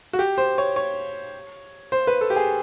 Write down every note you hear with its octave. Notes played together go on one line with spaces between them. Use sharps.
F#4
G4
C5
C#5
C#5
C5
B4
A4
G4
G#4